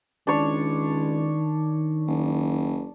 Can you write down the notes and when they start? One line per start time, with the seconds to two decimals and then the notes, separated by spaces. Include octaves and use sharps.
0.27 C#2 D#3 D4 C#5
2.07 F#1